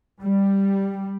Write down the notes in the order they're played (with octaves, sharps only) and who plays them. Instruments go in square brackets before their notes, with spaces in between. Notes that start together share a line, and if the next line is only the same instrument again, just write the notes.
[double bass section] G3